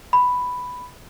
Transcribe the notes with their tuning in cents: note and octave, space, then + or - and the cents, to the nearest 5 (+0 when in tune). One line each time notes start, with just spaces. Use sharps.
B5 +5